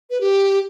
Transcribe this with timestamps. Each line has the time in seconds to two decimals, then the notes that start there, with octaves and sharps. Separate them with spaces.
0.10 B4
0.21 G4